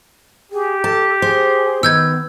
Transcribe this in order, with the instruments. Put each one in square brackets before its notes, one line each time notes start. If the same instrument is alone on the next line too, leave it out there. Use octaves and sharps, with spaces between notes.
[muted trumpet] G4 [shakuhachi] G#4
[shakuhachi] A4 [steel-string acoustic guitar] A5
[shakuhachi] G#4 [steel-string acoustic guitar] C5
[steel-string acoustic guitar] D#3 [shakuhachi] B3 [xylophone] E6 G6 G#6